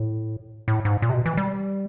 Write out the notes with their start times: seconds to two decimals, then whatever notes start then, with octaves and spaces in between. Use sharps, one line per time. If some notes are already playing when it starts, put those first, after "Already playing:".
Already playing: A2
0.68 A2
0.85 G#2
1.02 A#2
1.09 C3
1.14 B2
1.26 E3
1.37 G3